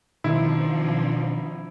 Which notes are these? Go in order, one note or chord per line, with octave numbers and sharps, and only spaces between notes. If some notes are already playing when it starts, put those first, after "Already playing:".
B2 D#3 F3 C4 D4 E4